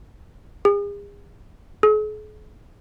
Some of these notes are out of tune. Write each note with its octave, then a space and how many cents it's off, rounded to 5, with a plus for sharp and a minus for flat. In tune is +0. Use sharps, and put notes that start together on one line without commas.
G#4 -40
G#4 +45